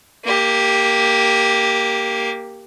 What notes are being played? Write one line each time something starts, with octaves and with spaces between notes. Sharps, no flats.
A#3 G4